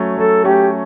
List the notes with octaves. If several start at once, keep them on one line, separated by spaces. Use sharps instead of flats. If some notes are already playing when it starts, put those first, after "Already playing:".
Already playing: F#3 A3 C#4
F#3 A4
A3 C#4 G4